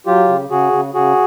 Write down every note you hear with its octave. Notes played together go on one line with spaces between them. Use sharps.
F#3 F4 G4
C#3
C#3 F#4 G#4
C#3
C#3 F#4 G#4